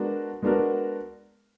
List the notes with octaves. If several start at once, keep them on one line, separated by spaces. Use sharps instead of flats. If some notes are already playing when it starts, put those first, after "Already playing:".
Already playing: G#3 B3 D4 F#4 A#4
G#3 B3 D4 F#4 A#4